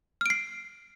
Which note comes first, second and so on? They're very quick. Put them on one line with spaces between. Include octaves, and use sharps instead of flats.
F6 D7 C7